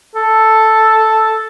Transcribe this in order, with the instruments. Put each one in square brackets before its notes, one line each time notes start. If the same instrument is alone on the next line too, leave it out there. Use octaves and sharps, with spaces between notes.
[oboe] A4